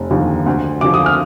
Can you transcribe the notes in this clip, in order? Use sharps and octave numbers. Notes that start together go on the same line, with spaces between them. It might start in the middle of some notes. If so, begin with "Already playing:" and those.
Already playing: F1
D#2 D3 F3
D2
D3 F3 D6
D#6
F6